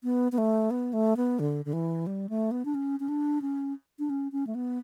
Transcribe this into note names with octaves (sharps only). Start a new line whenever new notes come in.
B3
B3
A3
B3
A3
B3
D3
D3
E3
G3
A3
B3
D4
C#4
C#4
D4
C#4
D4
C#4
C#4
A3
B3